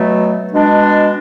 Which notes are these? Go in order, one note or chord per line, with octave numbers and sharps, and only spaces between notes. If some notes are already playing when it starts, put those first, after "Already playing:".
Already playing: B2 F#3 A3
B2 G#3 D4